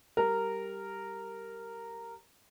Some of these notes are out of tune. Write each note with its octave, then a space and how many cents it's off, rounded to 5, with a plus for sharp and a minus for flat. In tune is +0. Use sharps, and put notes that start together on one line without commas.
G3 +0 A#4 -10